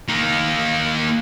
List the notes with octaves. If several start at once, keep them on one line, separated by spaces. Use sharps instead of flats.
A#3 D#4